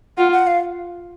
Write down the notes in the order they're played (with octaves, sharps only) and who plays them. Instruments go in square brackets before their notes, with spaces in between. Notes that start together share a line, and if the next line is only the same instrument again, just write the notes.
[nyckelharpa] F4 [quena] F#5
[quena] F#5
F5